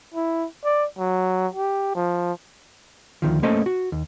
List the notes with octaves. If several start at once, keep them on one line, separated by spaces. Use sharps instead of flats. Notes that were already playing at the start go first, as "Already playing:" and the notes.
E4
D5
F#3
G4
F3
D2 D#3 F3
A3 A#3 C#4 A4 C5 D#5
F#4
D#2